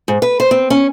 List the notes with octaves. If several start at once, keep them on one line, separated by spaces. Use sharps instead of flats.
G#2
B4
C5
C4
C#4